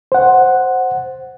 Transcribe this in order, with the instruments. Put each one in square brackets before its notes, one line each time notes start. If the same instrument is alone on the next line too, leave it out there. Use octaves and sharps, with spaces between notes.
[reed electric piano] C5 F#5